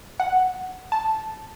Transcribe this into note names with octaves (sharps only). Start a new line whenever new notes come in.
F#5
A5